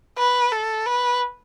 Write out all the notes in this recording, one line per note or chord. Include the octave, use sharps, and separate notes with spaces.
B4
A4
B4